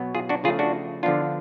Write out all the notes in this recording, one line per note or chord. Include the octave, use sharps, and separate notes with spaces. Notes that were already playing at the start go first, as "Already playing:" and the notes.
Already playing: B2 F#3 B3
F4 G#4
D4 F#4
C#3 F3 A3 F4 G#4
D4 F#4
D3 F3 B3 D4 F4